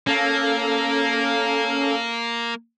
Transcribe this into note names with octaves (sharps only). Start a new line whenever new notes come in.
A#3 C#4 A4 F5